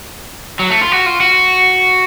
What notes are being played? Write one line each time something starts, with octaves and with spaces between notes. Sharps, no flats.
F#3
A3
F4
F#4
F4
F#4